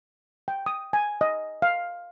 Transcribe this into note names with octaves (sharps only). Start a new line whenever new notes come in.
G5
D#6
G#5
D#5
F5